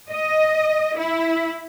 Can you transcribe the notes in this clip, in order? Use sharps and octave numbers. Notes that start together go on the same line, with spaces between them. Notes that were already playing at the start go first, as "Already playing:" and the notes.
D#5
E4